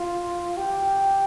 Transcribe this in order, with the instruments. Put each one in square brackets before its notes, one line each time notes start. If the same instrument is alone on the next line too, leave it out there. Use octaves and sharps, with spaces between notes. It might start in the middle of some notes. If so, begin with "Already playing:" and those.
Already playing: [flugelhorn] F4
G4